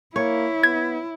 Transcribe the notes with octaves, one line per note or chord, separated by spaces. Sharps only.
A#3 E4 C#5
B3 G#6